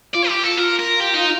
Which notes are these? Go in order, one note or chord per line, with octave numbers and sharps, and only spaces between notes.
F4 D5
G4
A4
F4 A#4
A#4
G4
D#4